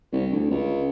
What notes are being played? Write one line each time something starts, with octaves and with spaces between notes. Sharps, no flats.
C2
D2
C#2